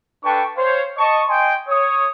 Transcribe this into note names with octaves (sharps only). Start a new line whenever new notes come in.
D4 A4 B4 G5 A5 C#6
C5 C#5 F5
D#5 A5 C#6
D#5 G5 G#5 C6
C#5 D#6